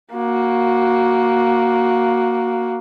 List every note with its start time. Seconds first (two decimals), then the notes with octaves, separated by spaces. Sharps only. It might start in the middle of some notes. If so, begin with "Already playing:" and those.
0.13 A#3 F#4